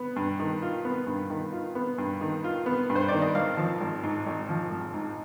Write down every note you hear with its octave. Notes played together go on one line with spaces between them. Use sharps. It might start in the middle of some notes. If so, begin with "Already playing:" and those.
Already playing: B3
G2
D#3
F4
B3
G2
D#3
F4
B3
G2
D#3
F4
B3
G2
C5
D#3 D5
D#5
G#1 F5
F3
G#1
G#2
G#1
F3
G#1
G#2